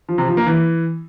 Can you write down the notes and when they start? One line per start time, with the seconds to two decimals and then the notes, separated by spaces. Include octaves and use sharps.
0.09 F3
0.18 C3
0.28 F3
0.37 A#3
0.47 E3